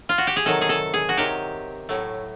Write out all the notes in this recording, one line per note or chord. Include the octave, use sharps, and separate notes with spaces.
F4
F#4
G4
G#4
C3 D#3 F#3 A4
G#4
A4
G#4
F#4
C3 D#3 F#3 G4
A2 F#3 A3